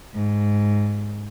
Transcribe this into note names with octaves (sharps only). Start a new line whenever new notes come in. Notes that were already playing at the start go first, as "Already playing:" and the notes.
G#2